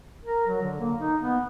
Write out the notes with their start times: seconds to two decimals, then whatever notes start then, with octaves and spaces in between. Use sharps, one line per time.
0.24 A#4
0.47 F#3
0.62 D3
0.80 A#3
1.00 D#4
1.21 B3